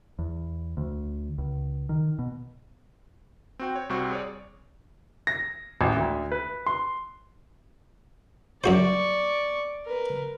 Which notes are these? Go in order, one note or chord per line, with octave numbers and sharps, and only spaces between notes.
E2
D2
C#2
D#3
B2
C4 F#4 G5
C#5
C2 G3 C4 F#4 C#6
G#4 C#5 D5
A#6
A1
D2
B4
C6
F#2 F#4 C5 D5 C#6
A#4 B4